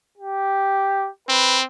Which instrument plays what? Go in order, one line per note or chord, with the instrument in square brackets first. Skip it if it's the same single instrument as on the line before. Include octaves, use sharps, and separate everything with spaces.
[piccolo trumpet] G4
[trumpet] C4 [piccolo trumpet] B4